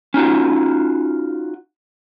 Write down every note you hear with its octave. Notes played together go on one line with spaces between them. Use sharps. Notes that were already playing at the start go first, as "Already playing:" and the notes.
C#4 D#4 F4 F#4